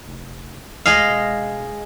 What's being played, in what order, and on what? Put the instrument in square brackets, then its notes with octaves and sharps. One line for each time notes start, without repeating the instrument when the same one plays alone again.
[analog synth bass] F1
[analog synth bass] D2 [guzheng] G#3 D#5 F5
[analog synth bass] E1